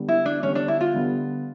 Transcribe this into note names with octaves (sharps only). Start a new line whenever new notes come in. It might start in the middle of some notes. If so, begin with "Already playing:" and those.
Already playing: D3 G3 B3
E4
D4
D3 G3 B3 C#4
D4
E4
F4
D3 G3 B3